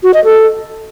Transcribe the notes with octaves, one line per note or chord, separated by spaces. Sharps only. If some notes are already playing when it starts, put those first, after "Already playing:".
F#4
D#5
A4